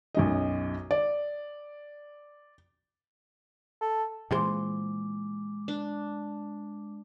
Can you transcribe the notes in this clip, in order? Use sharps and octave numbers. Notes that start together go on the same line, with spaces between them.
B1 F#2 D#5
D5
A4
A#2 C#3 E3 G#3 G#4 C5 D6
D4